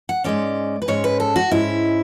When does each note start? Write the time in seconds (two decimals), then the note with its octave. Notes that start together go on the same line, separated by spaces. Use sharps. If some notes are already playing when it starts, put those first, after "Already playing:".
0.09 F#5
0.24 G#2 G#3 C#4 D5
0.82 B4
0.88 G#2 G#3 C#4 C#5
1.04 B4
1.20 A4
1.36 F#4
1.51 G#2 G#3 C#4 E4